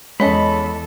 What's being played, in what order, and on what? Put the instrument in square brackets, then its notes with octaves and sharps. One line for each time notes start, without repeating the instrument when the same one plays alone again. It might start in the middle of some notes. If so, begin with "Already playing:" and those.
[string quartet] E2 A4 [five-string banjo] F#3 C#4 D#5 [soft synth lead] G#3 [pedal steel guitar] B5